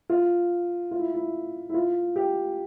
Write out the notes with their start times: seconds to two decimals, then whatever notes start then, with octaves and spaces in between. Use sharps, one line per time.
0.10 F4
0.91 F4
0.99 E4
1.14 E4
1.70 E4
1.74 F4
2.16 G4